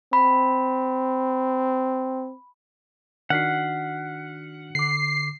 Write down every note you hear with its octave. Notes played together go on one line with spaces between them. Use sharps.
C4 B5
D#3 D4 F#4 F#5 F6 B6 C7
D3 D6 C7